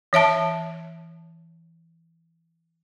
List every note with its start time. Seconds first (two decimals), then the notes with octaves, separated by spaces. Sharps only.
0.13 E3 C#5 E5 A5